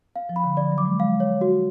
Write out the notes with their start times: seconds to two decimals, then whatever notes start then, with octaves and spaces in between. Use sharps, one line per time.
0.16 F5
0.29 F3
0.36 B5
0.44 D3
0.57 F3 D5
0.72 F#3
0.78 D6
0.86 G#3
0.99 G#3 F5
1.20 C#5
1.41 F#4